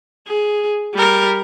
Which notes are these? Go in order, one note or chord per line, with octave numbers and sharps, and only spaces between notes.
G#4
G3 A#4